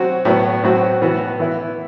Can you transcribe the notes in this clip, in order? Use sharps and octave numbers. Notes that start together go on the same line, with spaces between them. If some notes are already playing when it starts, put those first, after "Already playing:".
Already playing: F#3 C4 F#4
A2 F#3 B3
A2 F#3 C4 F#4
A2 E3 B3 F#4
E3 B3 E4